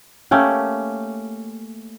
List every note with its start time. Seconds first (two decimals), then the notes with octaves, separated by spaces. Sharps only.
0.31 A3 A#3 C#4 G4